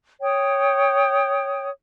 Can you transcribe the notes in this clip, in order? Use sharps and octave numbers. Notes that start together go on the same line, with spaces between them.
C#5 G5 D#6